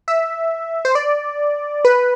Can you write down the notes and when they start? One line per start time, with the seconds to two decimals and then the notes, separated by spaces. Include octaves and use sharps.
0.08 E5
0.85 C5
0.95 D5
1.85 B4